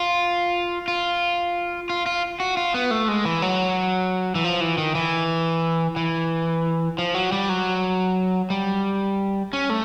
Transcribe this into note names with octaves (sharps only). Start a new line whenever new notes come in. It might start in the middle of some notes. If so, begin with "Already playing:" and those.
Already playing: F4
F4
F4
F4
F#4
F4
B3
A3
G#3
E3
F#3
E3
F3
E3
D#3
E3
E3
F3
F#3
G3
F#3
G3
C#4
A3